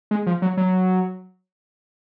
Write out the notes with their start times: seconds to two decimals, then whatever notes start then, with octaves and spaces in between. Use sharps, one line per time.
0.11 G#3
0.27 F3
0.42 F#3
0.57 F#3